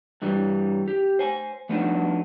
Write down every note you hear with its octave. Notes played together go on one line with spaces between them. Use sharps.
G2 E3 G3
G4
C5 G#5
F3 A3 B3 D4 D#4 F#4